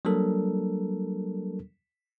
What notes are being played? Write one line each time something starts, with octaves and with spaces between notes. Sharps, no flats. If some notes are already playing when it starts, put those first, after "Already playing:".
F#3 G3 A#3 D4 A4 A#4